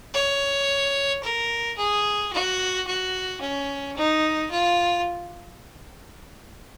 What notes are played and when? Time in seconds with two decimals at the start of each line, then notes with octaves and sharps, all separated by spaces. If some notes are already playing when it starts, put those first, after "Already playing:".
0.14 C#5
1.23 A#4
1.77 G#4
2.33 F#4
2.87 F#4
3.41 C#4
3.97 D#4
4.51 F4